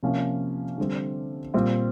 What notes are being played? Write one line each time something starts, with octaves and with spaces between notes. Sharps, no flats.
C3 F3 A#3 C#4
D3 G3 C4
A#2 G3 C4 F4